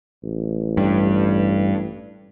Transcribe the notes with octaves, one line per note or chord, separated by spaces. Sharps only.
A1
G2